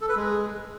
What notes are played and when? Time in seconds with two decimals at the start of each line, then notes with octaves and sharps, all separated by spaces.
0.01 A4
0.09 B4
0.16 G#3